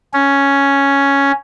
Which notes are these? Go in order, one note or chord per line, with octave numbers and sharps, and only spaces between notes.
C#4